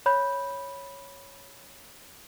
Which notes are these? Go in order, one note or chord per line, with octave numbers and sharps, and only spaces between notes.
C#5 B5 G6